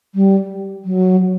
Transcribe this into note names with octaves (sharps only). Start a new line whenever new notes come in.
G3
F#3